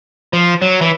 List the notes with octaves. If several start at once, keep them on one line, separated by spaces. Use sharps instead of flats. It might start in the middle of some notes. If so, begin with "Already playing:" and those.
F3
F#3
E3